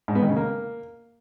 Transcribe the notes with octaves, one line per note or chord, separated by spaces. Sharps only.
G#2
B3
D#3
C#3
A#3